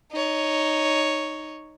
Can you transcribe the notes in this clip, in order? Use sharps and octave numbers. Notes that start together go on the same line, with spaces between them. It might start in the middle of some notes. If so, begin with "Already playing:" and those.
D#4 C#5